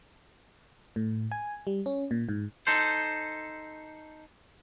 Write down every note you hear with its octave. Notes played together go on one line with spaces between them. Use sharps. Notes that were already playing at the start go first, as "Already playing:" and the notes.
A2
G#5
G3
C#4
A#2
G#2
D#4 A4 C5